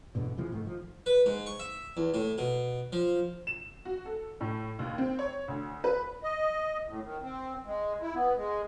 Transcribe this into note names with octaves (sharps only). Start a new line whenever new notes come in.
E2 G#2 B2 D3
C3 E3 F3 G#3
G#2 D#3 A3
F3
B4
G#2
C#6
E5
E2
A2
B2
F3
E7
F#4
A4
A2
D#2
C4
C#5
D2
B4
D#5
A2
D#3
C4
G#3
E4
B3
G#3